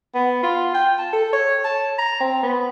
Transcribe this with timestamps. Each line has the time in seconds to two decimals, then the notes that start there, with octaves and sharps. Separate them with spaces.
0.14 B3
0.43 F4
0.74 G5
0.99 A5
1.13 A4
1.33 C#5
1.64 A5
1.98 A#5
2.20 C4
2.43 B3